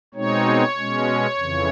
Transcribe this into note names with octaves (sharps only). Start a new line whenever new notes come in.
B2 G#3 C4 D#4 C#5
B2 G#3 C#4
F2 C#3 E3